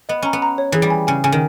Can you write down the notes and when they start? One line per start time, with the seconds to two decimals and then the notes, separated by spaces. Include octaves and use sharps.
0.09 B3 D#5
0.22 C#4 A#5
0.33 B3
0.42 A#5
0.58 C#5
0.72 E3 G#4
0.82 G3
0.90 G#5
1.07 C#3 G#5
1.24 C#3 G#5
1.32 D#3